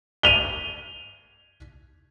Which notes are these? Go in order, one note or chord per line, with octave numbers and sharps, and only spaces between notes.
D#7 F7 G7